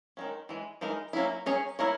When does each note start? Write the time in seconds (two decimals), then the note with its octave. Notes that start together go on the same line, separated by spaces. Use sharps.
0.17 D#3 G#3 C#4
0.49 E3 G#3
0.81 E3 G#3 D#4 A#4
1.13 F#3 A#3 C#4 E4
1.46 F#3 C#4 G#4 C#5
1.79 A#3 E4 A#4 C#5